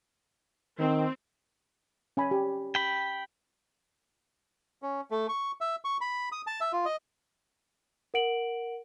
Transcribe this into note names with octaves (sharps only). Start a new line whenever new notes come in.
D#3 C4
C#4 G#5 B5
G4
G5 B5
C#4
A3
C#6
E5
C#6
B5
D#6
A5
E5
F4
D#5
A#4 F#5 D7 F#7